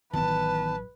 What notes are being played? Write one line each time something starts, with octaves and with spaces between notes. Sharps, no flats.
A1 D#3 E3 F#3 B3 B4 A5